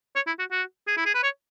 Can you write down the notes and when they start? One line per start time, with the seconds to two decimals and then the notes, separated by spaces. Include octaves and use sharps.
0.15 C#5
0.27 E4
0.39 F#4
0.51 F#4
0.87 G#4
0.97 E4
1.06 G#4
1.14 B4
1.23 C#5